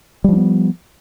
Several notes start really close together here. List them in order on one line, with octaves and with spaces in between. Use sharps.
G3 F3 D4 B3